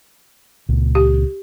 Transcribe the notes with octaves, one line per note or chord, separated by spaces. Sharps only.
C#2 A#2
G4